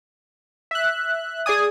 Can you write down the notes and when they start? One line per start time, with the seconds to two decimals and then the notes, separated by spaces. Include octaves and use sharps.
0.71 E5 F#6
1.46 G#4 D5 G#5 D#6